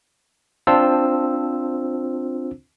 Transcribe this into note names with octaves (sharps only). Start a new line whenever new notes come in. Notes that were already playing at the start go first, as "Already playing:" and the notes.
C4 D4 F4 C5 A5 E6